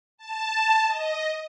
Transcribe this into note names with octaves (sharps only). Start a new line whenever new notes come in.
A5
D#5